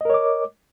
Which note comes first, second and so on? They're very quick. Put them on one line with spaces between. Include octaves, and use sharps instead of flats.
D#5 A#4 C#5 D6